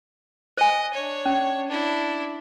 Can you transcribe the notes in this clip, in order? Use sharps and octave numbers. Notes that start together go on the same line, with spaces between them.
C5 D#5 G#5
D4 C#5
C#4
D4 E4